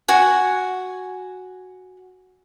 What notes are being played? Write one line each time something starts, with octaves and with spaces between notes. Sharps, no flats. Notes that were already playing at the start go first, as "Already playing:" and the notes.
F#4 F#5 G#5